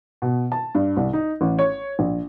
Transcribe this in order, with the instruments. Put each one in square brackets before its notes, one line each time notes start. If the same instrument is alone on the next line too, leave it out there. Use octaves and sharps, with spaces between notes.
[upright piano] B2
A5
G2
C2
D#4
A1
C#5
A#1